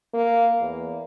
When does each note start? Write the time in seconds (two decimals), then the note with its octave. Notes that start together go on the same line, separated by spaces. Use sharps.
0.14 A#3
0.61 E2